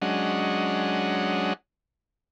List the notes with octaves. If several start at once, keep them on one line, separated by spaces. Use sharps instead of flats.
F#3 G#3 C#4 D4 D#5 F#5